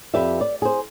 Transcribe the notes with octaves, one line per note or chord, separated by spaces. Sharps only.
F2 G4 B4 D5 E5
D5
G#4 C5